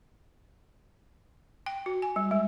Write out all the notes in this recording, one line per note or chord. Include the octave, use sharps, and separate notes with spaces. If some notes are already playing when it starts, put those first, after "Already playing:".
G5
F#4
G#5
G3
G#3